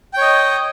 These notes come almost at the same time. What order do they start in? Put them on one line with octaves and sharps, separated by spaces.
G5 C#5 D#5